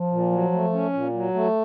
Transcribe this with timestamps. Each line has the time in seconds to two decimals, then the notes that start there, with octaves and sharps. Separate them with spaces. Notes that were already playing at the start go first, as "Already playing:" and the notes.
Already playing: F3
0.11 A#2
0.31 F#3
0.53 A3
0.73 C#4
0.93 A#2
1.13 F#3
1.34 A3